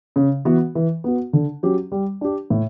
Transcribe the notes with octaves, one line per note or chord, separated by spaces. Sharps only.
C#3
E3 B3 F#4
E3
B3 F#4
D3
F#3 C#4 G4
G3
D4 G4
A2